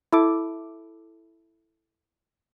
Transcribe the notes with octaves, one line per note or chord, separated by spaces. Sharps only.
E4 A4 D6